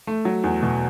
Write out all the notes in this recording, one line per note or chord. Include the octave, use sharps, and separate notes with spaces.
A3
F#3
E2
B2